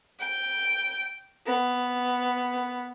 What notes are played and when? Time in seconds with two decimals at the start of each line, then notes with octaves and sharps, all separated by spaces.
0.19 G5
1.46 B3